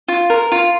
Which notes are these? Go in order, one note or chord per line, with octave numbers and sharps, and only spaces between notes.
F4
A#4
F4